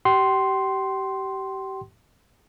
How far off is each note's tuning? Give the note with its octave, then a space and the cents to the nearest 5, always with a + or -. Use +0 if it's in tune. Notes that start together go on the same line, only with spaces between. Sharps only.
G4 -25 G5 -40 C6 +0